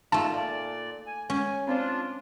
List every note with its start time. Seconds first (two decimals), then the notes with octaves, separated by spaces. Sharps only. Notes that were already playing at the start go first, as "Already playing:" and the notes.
0.12 F#2 B2 G#3 A3 D#4 F4 G#4 A5
0.34 A#2 D5 F5
1.07 G#5
1.30 G#3 C#4 C#5 G#5
1.67 C4 D4 F4 C5 D5